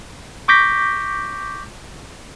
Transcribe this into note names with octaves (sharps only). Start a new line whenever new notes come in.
C#6 D6 G6 A#6 B6